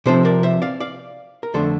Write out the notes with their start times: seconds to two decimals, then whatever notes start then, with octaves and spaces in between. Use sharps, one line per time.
0.06 C3 F3 C4 A4 C5
0.25 A#4 D5
0.43 C5 E5
0.62 D5 F5
0.80 D5 F5
1.43 A#4
1.54 F2 D3 A3 D4 A4 C5